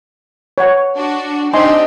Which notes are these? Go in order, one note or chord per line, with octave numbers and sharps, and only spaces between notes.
C#5 F#5
D4 F#4
C4 D4 D#4 G4 D#5 G#5 C6